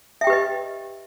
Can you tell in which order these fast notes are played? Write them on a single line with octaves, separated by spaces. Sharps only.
E5 G5 G4 B4 D#5